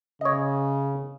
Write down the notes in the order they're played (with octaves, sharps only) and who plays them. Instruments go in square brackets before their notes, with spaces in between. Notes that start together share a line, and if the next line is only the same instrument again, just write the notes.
[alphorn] C#3 [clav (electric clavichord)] C#5 D#5